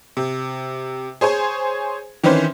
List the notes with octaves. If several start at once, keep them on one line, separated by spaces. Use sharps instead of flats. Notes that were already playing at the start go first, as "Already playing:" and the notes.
C3
G#4 C5 C#5 G#5
D#3 E3 C4 C#4 B4 C5